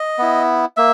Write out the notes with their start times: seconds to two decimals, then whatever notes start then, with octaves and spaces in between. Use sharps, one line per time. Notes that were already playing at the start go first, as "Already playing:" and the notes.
Already playing: D#5
0.18 B3 E4
0.77 A#3 E5